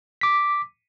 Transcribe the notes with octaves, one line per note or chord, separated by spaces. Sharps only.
D6 B6